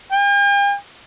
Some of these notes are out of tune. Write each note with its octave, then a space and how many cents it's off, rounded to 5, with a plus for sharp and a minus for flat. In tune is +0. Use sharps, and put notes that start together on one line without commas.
G5 +45